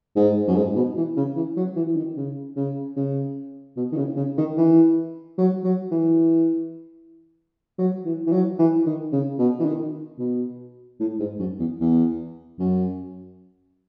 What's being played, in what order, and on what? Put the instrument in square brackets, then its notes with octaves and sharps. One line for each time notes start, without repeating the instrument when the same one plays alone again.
[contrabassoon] G#2
F#2
G#2
B2
E3
C#3
E3
F#3
E3
E3
D#3
C#3
C#3
C#3
B2
D#3
C#3
C#3
D#3
E3
F#3
F#3
E3
F#3
E3
E3
F#3
E3
D#3
C#3
B2
E3
D#3
B2
A2
G#2
F#2
E2
E2
F#2